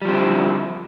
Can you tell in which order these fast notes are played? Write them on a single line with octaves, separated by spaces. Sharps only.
G3 F3 C4 D3 E4